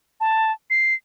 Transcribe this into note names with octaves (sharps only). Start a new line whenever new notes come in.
A5
C7